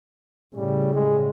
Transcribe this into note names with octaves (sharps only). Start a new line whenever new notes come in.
A2 C#3 G3
G#3